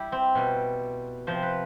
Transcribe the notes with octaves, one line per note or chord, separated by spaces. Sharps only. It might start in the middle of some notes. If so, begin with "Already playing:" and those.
Already playing: G3 E4 G4
C4
B2 G3
C3 F3 C5
B4